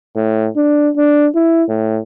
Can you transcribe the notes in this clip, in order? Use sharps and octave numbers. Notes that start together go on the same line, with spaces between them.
A2
D4
D4
E4
A2